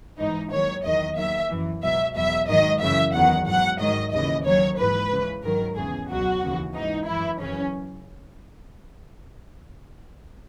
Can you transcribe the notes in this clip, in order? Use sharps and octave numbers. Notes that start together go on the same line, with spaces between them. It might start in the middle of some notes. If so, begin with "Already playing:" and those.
G#2 E3 D#4
D#2 D#3 F#3 C#5
E2 D#3 F#3 D#5
D#2 D#3 F#3 E5
F#2 E3
C#2 B2 F#3 E5
E2 B2 F#3 E5
G#2 D#3 F#3 D#5
F#2 C#3 E3 E5
E2 D#3 F#3 F#5
G#2 F#3 F#5
G#2 D#3 F#3 D#5
D#2 C#3 E3 D#5
D#2 D#3 F#3 C#5
G#2 E3 B4
C#2 C#3 E3
G#2 D#3 F#3 A#4
E2 C#3 E3 G#4
C#2 B2 F#3 F#4
D#2 C#3 E3
G#2 E3 D#4
F#2 E3 E4
F#2 C#3 E3 C#4